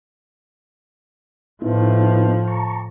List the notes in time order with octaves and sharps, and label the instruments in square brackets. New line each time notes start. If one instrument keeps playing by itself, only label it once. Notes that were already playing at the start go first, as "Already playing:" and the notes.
[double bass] A2 F3 [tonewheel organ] B3 D#4 E4
[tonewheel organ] A5 A#5 C#6